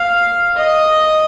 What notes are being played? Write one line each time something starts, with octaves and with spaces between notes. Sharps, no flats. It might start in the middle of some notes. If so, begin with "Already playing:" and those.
Already playing: F5
D#5